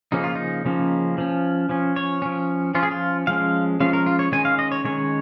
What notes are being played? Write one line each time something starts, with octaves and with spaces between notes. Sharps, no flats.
C#3 F3 A#3 C#4 D#4
F4
D#4
C#3 F3 A#3 C#4
F3 C#4
F3 C#4
C#5
F3 C#4
F3 C#4 F4
G#4
F4
F3 G#3 C#4 F5
F3 G#3 C#4 F5
A#4
F4
C#5
D#3 G#3 C#4 G#5
F5
D#5
C#5
D#3 G#3 C#4 C#5